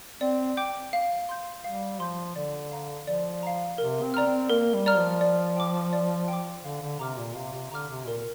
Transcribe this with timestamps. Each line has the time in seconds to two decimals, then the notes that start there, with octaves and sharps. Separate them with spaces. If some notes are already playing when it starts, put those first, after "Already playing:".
0.21 C4 D5
0.57 G5 D6 G6
0.93 F5
1.29 C6 G6
1.64 G3 F5
1.99 F3 C6 G6
2.36 D3 D5
2.71 F5 A#5
3.07 F3 D5
3.43 F5 A#5
3.78 C3 A#4
4.02 C4
4.14 D5 A#5 F6
4.26 C4
4.50 A#3 A#4
4.74 G3
4.86 D5 A#5 F6
4.98 F3
5.21 D5
5.56 G5 D6
5.93 D5
6.28 G5
6.33 D6
6.64 D3 F5
6.82 D3
6.99 C3 A#5 D6 F6
7.17 A#2
7.35 C3 F5
7.53 C3
7.71 D3 A#5 D6 F6
7.90 C3
8.07 A#2 A#4